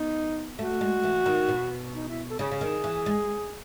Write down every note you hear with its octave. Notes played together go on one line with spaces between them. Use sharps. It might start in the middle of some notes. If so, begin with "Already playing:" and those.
Already playing: B3 D#4
A3 F#4
G#3
E3
D#3
B2
D#4
E4
A4
C#3 G#4
C#3
D#3
E3
G#3